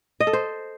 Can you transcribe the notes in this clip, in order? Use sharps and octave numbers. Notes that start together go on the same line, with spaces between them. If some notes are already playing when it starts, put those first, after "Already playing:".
D#5
A4
C5